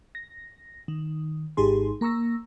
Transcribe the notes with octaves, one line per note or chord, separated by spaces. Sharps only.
A#6
D#3
G#1 G#2 D#4 G4 G#4 C6
A#3 A#5 C#6 E6 A#6